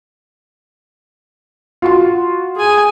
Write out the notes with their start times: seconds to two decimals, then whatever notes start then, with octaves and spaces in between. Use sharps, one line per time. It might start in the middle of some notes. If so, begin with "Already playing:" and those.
1.82 F4 F#4 C6
2.56 G#4 G#5